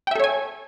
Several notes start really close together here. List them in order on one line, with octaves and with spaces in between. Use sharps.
G5 E5 A4 C#5 G#5